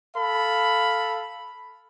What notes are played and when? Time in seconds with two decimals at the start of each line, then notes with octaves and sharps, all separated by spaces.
0.16 A4 F5 B5